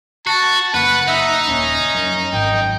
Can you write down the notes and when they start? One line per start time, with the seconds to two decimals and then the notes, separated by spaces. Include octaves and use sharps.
0.27 F#4 A5
0.74 F#1 B4 F#5
1.08 D#4 E5
1.48 D#1 C#4
1.95 F#2
2.33 G#1 F#2 G5